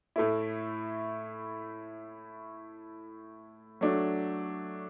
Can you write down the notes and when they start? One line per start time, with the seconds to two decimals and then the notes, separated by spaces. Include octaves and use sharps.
0.16 A2 A3 E4
3.81 F#3 A3 D4